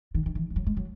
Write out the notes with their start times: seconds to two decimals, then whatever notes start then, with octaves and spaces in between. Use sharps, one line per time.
0.14 D#3
0.26 D#3
0.35 E3
0.50 G#3
0.56 F#3
0.66 G#3
0.77 F#3